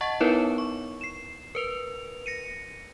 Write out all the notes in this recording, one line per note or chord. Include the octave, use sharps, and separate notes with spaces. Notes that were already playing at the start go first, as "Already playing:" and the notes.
D#5 F#5 A5 C#6 A6
B3 D#4 E4 A#4 B4 C#5
C#6
C7 E7
A#4 B4 F7
A#6 C#7 D#7